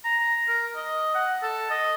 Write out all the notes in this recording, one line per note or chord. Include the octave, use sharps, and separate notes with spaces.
A#5
A#4
D#5
F#5
A4
D#5